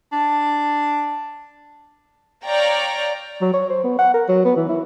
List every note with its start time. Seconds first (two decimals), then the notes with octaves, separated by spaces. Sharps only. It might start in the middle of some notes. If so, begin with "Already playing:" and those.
0.12 D4
2.43 C#5 D5 F5 G5 A#5
3.41 F#3
3.54 C#5
3.69 C5
3.84 B3
3.99 F#5
4.14 A#4
4.29 F#3
4.45 B3
4.57 E3
4.69 E4